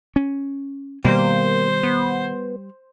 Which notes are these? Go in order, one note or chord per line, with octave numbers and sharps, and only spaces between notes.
C#4
B2 D#3 G3 A#3 C5
B3